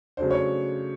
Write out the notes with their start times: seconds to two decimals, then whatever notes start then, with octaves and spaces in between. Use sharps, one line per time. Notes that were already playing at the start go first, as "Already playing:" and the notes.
0.17 C#3 F#3 A3 D4 C5
0.31 C#5